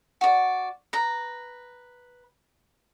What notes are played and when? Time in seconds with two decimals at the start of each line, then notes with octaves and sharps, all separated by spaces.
0.21 F#4 D5
0.93 B4 A#5